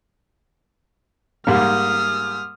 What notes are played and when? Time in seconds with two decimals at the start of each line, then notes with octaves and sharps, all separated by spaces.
1.47 G#2 G3 A#3 D#6 F6